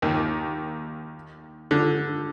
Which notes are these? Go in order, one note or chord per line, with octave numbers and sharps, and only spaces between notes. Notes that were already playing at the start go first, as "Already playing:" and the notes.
D#2 D#3
D3